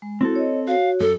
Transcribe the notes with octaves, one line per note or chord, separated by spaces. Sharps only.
G#3
C4 E4 F#4 A4
C#5 D#5
F#4 C#5 F5
F#2 A4